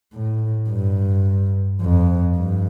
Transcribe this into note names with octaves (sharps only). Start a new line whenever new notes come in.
A2
G2
F2
G2